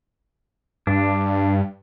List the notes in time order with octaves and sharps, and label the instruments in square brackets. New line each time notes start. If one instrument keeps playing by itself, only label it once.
[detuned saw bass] G2 [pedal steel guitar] D4